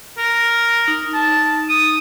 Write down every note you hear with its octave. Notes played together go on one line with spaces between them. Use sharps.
A#4
D#4
A5
D#6